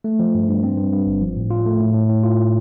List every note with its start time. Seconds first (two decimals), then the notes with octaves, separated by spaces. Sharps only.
0.04 A3
0.19 F3
0.35 G2
0.49 G2
0.63 C4
0.78 G2
0.93 G2
1.07 G1
1.21 F3
1.36 A2
1.50 F4
1.66 A3
1.80 A2
1.94 A2
2.09 A2
2.24 F4